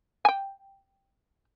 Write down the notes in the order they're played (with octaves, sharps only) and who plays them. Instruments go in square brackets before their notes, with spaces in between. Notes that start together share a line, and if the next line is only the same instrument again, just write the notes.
[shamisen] G5 G#5